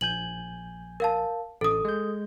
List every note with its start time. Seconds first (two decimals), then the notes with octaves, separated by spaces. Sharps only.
0.01 A#1 G#5 G6 F#7
1.00 A#4 F5 A5
1.61 A1 A4 D#6
1.85 G#3 G6